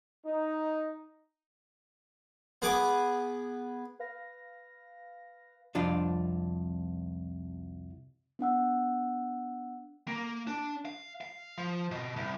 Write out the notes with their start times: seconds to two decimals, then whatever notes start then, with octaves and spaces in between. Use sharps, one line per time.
0.24 D#4
2.62 B3 G#4 B4 F#5 G#5 D6
3.99 B4 F5 A#6
5.75 C2 F2 D4 F4
8.39 B3 D4 F#5 E6
10.08 A#3
10.47 D4
10.85 F5
11.21 F5
11.58 F3
11.91 B2
12.16 C2